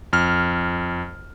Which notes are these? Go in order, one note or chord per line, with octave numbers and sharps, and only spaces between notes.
F2 F6